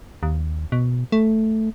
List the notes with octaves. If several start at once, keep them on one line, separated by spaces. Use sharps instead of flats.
D#2
B2
A3